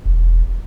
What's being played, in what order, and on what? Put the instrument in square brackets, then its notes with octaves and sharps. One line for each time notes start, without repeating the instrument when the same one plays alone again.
[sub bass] E1